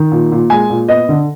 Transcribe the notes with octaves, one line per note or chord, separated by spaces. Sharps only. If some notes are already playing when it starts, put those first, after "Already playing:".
Already playing: D#3
A#2
A#2
G#3 G#5
A#2
B3 D#5
D3